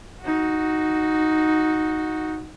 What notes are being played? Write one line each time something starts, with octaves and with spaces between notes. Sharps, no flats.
D#4 F#4